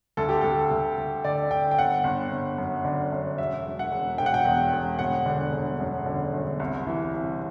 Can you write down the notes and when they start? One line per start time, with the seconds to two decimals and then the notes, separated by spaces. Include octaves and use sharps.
0.17 D2 A4
0.29 G4
0.41 D2 A4
0.71 D2
0.98 D2
1.24 D3 D5
1.51 D3 G5
1.71 G5
1.78 G1 F#5
2.04 G1
2.32 G1
2.58 F#2
2.85 D3
3.12 F#2
3.38 E1 E5
3.65 E1
3.79 F#5
3.92 E1
4.18 E1 G5
4.26 F#5
4.34 G5
4.45 E2
4.73 E1
4.99 G1 F#5
5.26 D3
5.53 G1
5.80 F#2
6.06 D3
6.33 G1
6.60 C2
6.87 E3
7.14 C2